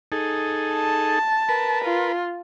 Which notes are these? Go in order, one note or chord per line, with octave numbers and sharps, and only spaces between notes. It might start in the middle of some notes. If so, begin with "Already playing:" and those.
D#4 G#4 A4
A5
A#4 B4
F4